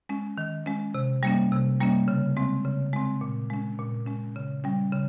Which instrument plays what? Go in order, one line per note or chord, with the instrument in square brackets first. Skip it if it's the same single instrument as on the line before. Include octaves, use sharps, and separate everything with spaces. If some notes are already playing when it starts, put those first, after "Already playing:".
[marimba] G#3 C#4
D#3
G#3 C#4
C3
G3 A#3 C#4
C3
G3 A#3 C#4
C#3
G#3 C4
C#3
G#3 C4
A#2
G#3 C#4
A#2
G#3 C#4
C#3
G3 C#4
C#3